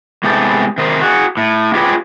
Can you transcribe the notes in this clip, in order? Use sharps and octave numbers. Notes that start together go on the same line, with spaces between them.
A2 C3 G#3 B3 G4 A4
C3 D#3 A#4 C5
F#4 G#4
A2
F4 G4 G#4 B4 C#5 G5